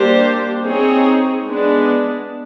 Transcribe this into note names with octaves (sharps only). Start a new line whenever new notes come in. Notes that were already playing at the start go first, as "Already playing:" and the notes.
Already playing: G3 A#3 D4 G4 C5
C4 D#4 G#4 C#5
G#3 B3 D4